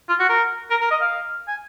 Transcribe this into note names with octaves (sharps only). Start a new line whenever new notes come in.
F4
F#4
A#4
A#4
A#4
D#5
F5
G#5